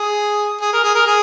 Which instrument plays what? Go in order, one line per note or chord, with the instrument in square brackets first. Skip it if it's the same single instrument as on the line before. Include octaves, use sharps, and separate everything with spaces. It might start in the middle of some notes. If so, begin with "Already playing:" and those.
Already playing: [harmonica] G#4
G#4
A#4
G#4
A#4
G#4